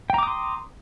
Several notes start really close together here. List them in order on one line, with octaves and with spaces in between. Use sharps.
G5 A#5 D6 D#6 C6